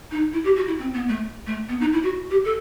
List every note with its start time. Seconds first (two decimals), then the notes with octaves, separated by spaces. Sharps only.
0.11 D#4
0.33 E4
0.44 G4
0.56 F#4
0.67 E4
0.79 C4
0.94 B3
1.08 A3
1.46 A3
1.69 B3
1.80 D#4
1.92 E4
2.03 F#4
2.30 G4
2.45 A4